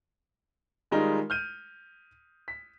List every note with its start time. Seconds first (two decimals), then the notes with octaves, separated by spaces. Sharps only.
0.91 D#3 G3 G#3 D#4 F4 A#4
1.30 F6 G6 D#7
2.48 B6